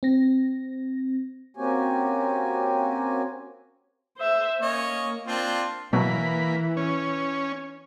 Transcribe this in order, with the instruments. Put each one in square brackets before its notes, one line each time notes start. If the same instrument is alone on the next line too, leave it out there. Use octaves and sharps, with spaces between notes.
[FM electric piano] C4 A#6
[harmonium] A#3 C4 C#4 F#4 G4 G#5
[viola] C5 E5
[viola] A#3 [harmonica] C#4 C#5 D#5
[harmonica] C4 D4 F4
[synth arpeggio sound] B2 F#3 [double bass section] E3 [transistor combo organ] A#3 B5
[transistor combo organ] C#4